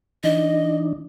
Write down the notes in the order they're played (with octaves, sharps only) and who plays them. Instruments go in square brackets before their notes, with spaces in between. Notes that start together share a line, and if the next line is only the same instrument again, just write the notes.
[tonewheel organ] E3 D4 D#4 [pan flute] D#5